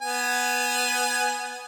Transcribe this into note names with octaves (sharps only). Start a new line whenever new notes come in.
B3 G#5